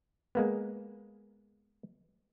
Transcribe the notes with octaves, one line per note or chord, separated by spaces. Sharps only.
G#3 A#3 B3